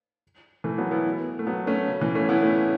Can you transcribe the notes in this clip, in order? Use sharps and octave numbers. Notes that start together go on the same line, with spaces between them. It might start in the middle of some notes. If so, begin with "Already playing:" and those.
E3 A3
F#3 B3
B3 E4
A3
F#3 B3
A3 C#4
C#3
E3
A3 C#4
B3 E4
A3 C#4